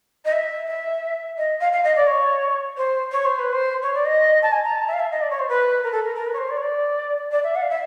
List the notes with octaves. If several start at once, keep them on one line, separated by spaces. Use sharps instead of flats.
D#5
E5
E5
D#5
F5
F5
D#5
D5
C#5
C5
C#5
C5
B4
C5
C#5
D5
D#5
A5
G#5
A#5
A5
E5
F5
E5
D#5
D5
C#5
C5
B4
A#4
A4
A#4
A#4
B4
C#5
C5
D5
C#5
D5
D5
E5
F#5
F5
E5